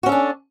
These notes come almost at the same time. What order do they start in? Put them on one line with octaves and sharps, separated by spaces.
F#4 C#4 A4 D4